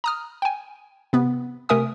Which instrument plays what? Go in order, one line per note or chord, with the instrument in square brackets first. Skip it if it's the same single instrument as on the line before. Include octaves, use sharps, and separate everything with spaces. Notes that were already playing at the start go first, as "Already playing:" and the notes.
[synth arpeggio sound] A#5 D#6 F6
G5 G#5
C3 B3
C3 A3 A#4 E5 G#5 D#6